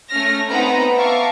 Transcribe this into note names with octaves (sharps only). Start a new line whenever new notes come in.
A3 C#4 F6 A#6
B3 C4 D#4 B4 F#5 A#5
E5 F5 A5 A#5 C#6 D6